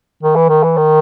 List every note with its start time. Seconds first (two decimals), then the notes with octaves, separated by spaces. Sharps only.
0.23 D#3
0.36 E3
0.49 D#3
0.63 E3
0.77 D#3